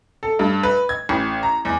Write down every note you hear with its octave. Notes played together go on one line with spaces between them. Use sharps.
A4
G2
B4
G#6
A1
A#5
E2